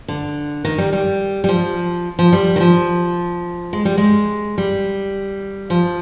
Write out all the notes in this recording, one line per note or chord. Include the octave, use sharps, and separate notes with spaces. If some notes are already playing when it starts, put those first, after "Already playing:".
D3
D#3
G3
G3
G3
F3
F3
G3
D#3
F3
G#3
G3
G#3
G3
F3